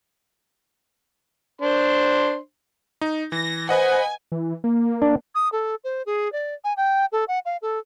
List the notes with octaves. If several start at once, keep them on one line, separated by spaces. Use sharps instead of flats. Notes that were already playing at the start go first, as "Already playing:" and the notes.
D4 C5 C6
D#4
E3 A#6
B4 C5 D#5 F#5 G#5
E3
A#3
D4
D#6
A4
C5
G#4
D5
G#5
G5
A4
F#5
F5
A4